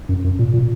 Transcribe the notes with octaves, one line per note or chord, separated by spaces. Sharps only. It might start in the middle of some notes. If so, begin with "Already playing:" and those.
F#2
F#2
A#2
A#2